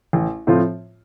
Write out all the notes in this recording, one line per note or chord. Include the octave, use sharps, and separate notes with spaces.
A1
A2 F3 C4 F4